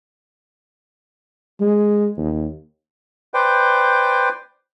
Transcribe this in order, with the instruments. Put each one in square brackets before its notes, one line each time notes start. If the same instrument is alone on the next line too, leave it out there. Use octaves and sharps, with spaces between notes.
[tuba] G#3
D#2
[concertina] B4 C5 D5 G5